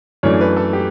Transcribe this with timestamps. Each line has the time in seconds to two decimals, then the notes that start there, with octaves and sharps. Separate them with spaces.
0.23 F#2 E3 A3 D4 C#5
0.41 B4
0.57 A4
0.73 G4